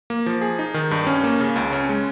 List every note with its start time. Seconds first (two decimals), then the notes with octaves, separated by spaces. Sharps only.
0.10 A#3
0.26 F3
0.41 G#4
0.59 D#4
0.74 D#3
0.91 G2
1.07 C#4
1.24 A#3
1.40 C#3
1.56 C#2
1.72 C#4
1.89 G#3